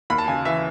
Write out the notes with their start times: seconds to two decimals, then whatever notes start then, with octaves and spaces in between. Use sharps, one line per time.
0.10 D#2 B5
0.18 A5
0.28 C#3 G#5
0.45 E3 E5